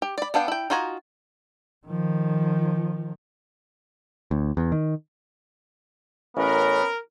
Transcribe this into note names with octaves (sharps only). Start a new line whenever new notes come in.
G4
D5 B5
B3 D4 F5 G5
E4 G5
D#4 F4 F#4 G#5 A#5
D#3 F3
D2
E2
D#3
A1 B3 C#4 A#4